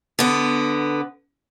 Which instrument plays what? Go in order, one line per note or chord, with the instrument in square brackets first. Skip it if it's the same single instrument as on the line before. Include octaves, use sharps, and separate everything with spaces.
[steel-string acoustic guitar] D3 B3